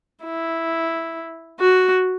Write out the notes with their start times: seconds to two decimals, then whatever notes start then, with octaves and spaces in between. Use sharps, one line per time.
0.24 E4
1.60 F#4